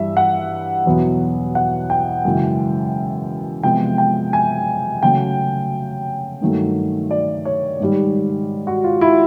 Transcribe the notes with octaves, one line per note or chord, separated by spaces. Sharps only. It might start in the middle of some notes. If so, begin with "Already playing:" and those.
Already playing: G2 E3 G3 E5
F#5
E2 B2 F#3 B3
F#5
G5
F#2 C#3 E3 G#3
C3 F3 G#3 B3 G5
G5
G#5
C#3 F#3 A3 G5
G2 D#3 F#3 A3
D5
C#5
G#2 D#3 G3
F#4
F4
E4